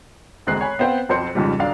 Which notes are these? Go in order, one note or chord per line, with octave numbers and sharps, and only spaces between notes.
E1 D2 G#3 C4 F#6 C7
C#5 G#5 B5
B3 C4 C5 F5 G5
B1 F2 C4 C5 C6 C#7
F2 G#2 C#3 F3 G3
D#1 B1 D4 F5